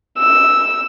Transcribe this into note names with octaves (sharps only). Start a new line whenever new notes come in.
E6